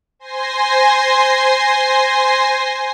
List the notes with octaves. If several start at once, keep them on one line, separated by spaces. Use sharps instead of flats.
C5 G#5 C6 A#6 C7